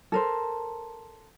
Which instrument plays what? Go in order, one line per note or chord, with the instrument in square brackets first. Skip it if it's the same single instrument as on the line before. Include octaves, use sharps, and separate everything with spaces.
[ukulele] A4 A#4 C5